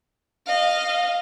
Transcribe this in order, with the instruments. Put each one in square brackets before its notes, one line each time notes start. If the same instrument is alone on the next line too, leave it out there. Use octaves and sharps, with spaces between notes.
[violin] D#5 F5